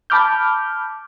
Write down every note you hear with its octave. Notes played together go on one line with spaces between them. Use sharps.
A5 B5 D6 F6 G6